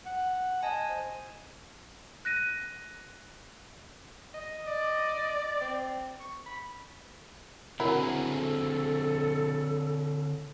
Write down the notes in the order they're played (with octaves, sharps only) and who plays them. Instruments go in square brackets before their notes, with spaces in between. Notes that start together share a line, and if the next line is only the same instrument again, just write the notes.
[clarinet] F#5
[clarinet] D#5 [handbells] G#5 A5
[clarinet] C5
[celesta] F#6 A#6 D#7
[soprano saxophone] D#5
[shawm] D5
[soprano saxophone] C4
C#6
B5
[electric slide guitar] D3 C4 G#4 [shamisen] F#3 E4 A#4
[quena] A4